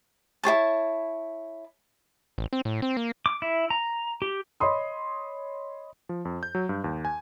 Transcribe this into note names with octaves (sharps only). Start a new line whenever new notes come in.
E4 G#4 C#5 A5
A1
C4
A2
C4
A#3
D6
E4
A#5
G4
C#5 D#5 B5 C6 D#6
F3
F2
G6
F#3
G2
D#2
G#5